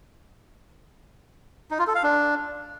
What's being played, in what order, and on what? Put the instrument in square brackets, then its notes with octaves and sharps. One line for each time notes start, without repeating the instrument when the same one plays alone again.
[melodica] D#4
F4
A4
F5
D4